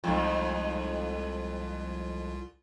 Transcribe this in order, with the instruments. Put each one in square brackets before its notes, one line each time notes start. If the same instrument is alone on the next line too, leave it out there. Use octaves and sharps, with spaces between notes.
[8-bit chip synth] C2 F4 [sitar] F2 G#2 A3